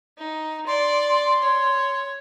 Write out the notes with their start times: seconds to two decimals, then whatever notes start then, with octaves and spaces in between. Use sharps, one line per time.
0.18 D#4
0.67 D5 C6
1.42 C#5